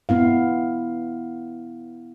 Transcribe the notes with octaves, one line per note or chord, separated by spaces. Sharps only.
B3 E4 F5